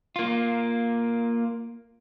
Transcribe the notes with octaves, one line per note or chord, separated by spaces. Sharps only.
A#3 F4